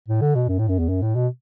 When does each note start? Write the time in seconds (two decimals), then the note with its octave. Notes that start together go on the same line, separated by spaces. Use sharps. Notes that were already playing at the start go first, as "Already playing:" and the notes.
0.08 A2
0.21 D3
0.35 B2
0.49 F#2
0.59 A2
0.69 F#2
0.79 E2
0.89 F#2
1.02 A2
1.15 B2